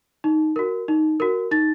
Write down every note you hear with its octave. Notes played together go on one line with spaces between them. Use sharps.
D#4
F#4 A#4
D#4
F#4 A#4
D#4 A6